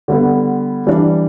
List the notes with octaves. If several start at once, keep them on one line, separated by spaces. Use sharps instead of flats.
D3 G3 B3
E3 G3 D4